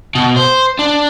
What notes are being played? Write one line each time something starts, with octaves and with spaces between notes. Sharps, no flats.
B2
C5
D4